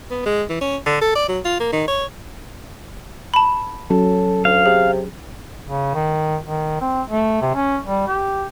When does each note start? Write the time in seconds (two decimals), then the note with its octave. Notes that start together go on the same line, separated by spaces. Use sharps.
0.11 B3
0.26 G#3
0.49 E3
0.61 C#4
0.86 D3
1.02 A4
1.16 D5
1.29 F#3
1.45 F4
1.60 A#3
1.73 D#3
1.88 C#5
3.34 A5 B5
3.90 F#3 C#4 A4
4.45 D2 F5
4.66 C3 G#4
5.67 C#3
5.94 D#3
6.43 D#3
6.81 C4
7.10 A3
7.41 C3
7.55 C#4
7.84 G3
8.07 G4